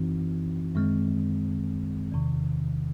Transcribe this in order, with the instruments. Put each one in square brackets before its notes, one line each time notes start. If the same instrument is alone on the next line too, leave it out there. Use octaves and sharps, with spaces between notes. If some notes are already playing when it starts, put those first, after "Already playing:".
Already playing: [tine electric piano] F#2 E3 C4 D#4 F#4
F#2 D#3 G#3 C4
E2 C3 D#3